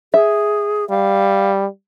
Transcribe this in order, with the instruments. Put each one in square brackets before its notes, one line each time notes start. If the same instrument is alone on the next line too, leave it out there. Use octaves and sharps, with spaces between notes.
[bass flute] G#4 [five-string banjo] E5
[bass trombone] G3 [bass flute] F5